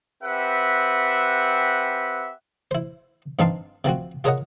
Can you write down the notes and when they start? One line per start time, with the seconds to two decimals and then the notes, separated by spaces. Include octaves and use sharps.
0.23 C4 G4 B4 E5 F#5
2.71 E4 C5
3.39 G2 C4 D#4 F5 A5 C6
3.84 C3 F3 C4 F#4
4.24 F4 G#4 A#4 C#5 D#5 F#5